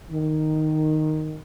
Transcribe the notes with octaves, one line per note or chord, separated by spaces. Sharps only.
D#3